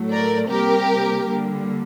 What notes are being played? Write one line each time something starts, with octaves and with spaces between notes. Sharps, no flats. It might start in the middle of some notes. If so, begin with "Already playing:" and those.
Already playing: A2 F#3 A3
A#4 D5
C3 G3 A#3 G4 A#4
D3 G3 A#3